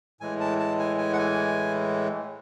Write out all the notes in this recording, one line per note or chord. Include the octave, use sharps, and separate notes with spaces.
A2 E3 G#3 G#5
A5
A5
G#5
G#5
F#5
G#5